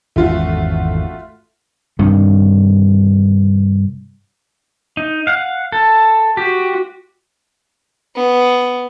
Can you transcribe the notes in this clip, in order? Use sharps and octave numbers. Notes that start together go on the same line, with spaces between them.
G#1 E2 A3 C#4 F4 F#4
G2 C3 D#3
D#4
F5 F#5
A4
F#4 G4
B3